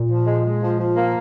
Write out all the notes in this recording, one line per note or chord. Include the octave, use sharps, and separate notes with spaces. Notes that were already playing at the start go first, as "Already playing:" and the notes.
Already playing: A#2
F3
G#3
G#3
F3
F3
A#3